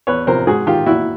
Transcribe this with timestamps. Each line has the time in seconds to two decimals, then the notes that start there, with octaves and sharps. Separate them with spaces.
0.07 E2 B4 C#5
0.27 C3 F3 A#4 C5
0.47 G#2 F#4 G#4
0.67 D#3 F4 G4
0.86 A#2 E4 F#4